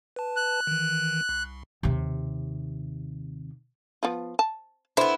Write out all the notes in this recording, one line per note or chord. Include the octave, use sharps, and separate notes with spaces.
B4 A5
F#6
D#3 E3
C2
D#2 C3
F3 B3 F4
A5
D3 B3 E4 C5